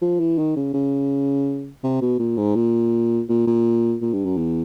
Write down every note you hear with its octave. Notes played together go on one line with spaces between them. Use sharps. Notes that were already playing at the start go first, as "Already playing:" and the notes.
F3
E3
D#3
C#3
C#3
C3
B2
A#2
G#2
A#2
A#2
A#2
A#2
G2
F#2
E2